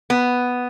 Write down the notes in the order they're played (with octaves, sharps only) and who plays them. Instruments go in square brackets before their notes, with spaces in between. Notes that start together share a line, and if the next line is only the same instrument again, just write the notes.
[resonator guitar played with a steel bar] B3